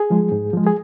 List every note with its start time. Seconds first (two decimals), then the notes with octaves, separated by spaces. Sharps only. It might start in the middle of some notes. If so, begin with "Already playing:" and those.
Already playing: G#4
0.10 F3 G#3
0.32 G#2
0.53 F3 G#3
0.67 G#4